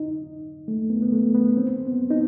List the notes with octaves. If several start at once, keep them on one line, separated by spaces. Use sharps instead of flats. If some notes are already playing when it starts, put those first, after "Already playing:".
Already playing: D#4
A3
B3
B3
A3
B3
C4
B3
D#4